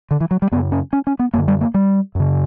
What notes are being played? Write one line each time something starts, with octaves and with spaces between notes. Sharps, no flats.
D3
E3
F#3
G3
F#2 C#3 B3
C#4
C#4
C#4
B3
F#2 D3 A#3
G3
A#3
G3
F#2 C#3